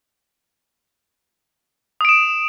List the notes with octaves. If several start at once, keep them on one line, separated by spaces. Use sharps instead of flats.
D#6 D7 E7